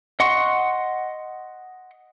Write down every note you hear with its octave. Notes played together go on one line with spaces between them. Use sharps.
D#5 F#5 C6 C#6